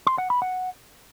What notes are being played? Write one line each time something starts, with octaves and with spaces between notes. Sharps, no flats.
C6
F#5
B5
F#5